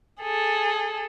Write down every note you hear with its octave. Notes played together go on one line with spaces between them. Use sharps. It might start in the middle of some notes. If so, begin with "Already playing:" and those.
G#4 A4